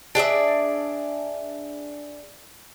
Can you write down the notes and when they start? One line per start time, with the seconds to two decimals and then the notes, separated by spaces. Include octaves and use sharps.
0.15 D4 G#4 D5 E5